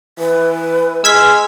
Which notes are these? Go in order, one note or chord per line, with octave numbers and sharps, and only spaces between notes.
E3 B4
G#3 E6 F6 G#6 B6